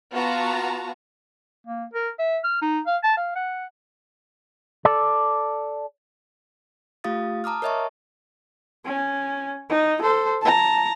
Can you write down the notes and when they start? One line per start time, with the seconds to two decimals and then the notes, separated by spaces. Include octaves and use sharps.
0.13 B3 F4 F#4 A5 A#5
1.67 A#3
1.94 A#4
2.19 E5
2.44 F6
2.62 D#4
2.87 F5
3.03 A5
3.17 F5
3.36 F#5
4.85 A4 D5
7.04 A3 F4 G4 F5 D#6 A6
7.44 A5 A#5 D6 D#6 F6
7.62 A#4 C#5 D#5 E5 A5 C#6
8.85 C#4
9.69 D#4
10.02 A4 C5
10.41 A5 A#5